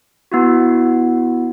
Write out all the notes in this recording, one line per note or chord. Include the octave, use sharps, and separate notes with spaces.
B3 E4 F#4